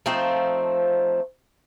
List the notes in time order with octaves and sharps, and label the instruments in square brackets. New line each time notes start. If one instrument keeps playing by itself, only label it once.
[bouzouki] F3 A3 C4 D#4